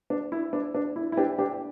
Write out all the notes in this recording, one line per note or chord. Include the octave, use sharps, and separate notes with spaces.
D4
E4
D4
D4
E4
E4
D4 G4
D4 G4